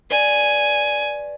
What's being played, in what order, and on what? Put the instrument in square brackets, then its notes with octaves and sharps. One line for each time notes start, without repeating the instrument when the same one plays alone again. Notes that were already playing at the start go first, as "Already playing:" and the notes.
[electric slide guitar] B4 D5 [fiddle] G#5